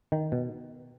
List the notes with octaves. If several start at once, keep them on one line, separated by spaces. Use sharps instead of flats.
D#3
B2